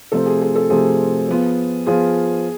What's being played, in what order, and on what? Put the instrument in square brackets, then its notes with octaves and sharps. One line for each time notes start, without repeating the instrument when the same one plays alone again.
[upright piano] C3 F3 A3 C4 [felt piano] A4
[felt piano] G#4
G#4
A4
[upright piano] C3 F3 A3 C4 [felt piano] G#4
[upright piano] F3 B3 F4
[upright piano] F3 B3 F4 [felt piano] G#4